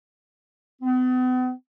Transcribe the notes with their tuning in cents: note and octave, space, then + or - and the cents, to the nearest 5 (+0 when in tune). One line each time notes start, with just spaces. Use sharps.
B3 +45